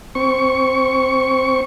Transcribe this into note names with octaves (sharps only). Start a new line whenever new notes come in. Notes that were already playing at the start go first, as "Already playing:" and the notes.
C4 C#6